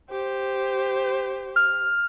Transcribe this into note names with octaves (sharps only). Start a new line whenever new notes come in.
G4 C5
F6